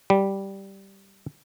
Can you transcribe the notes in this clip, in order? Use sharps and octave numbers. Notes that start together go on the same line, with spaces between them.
G3